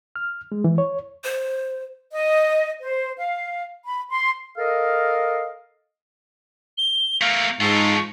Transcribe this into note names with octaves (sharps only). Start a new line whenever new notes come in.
F6
G#3
E3
C#5
C5
D#5
C5
F5
B5
C6
A4 A#4 D#5 F5
G7
A3 A#3 F5
G#2 F4 A4 C#6